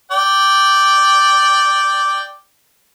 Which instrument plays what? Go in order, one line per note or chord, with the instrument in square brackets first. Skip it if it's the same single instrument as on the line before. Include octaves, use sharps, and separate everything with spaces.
[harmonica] D5 G5